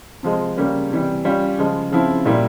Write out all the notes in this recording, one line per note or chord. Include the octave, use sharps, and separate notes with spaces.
C3 F3 G#3 C4
C#3 G3 A#3 C#4
C3 E3 G3
G3 C#4 F4
C#3 F3 G#3
C#3 F3 C4 E4
A#2 G3 A#3 E4